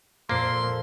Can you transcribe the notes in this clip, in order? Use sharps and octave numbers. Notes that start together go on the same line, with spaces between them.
F2 A#2 A#3 A4 C6